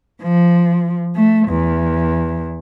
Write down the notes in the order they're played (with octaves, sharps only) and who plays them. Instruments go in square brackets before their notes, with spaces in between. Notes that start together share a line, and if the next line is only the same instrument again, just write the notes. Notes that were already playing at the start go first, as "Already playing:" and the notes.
[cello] F3
A3
E2